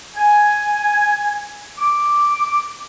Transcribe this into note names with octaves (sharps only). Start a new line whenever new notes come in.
G#5
D6